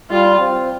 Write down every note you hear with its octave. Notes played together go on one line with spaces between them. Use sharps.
G3 F4
C4